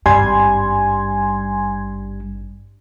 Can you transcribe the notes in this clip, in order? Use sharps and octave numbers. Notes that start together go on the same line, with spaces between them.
G#1 G2 G3 G#5 C6 G#6